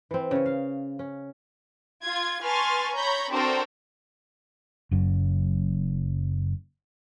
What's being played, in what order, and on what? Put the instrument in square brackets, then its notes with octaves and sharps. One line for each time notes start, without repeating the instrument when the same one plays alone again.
[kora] E3 C4
C#3 C#5
F5
C#4
[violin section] F4 G#6
B4 G#5 A5 C6 C#6 F6
C#5 A#5 B5 G6
C4 D4 F#4 A4 A#4 C5
[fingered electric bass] F#1 F#2